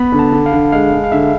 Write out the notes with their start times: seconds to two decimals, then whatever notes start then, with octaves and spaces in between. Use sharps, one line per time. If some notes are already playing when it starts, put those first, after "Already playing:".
Already playing: B3 B5
0.12 D3
0.19 A5
0.32 D3
0.46 F5
0.52 D3
0.72 G#3 F5
0.93 G#3
1.04 F5
1.12 D3 E5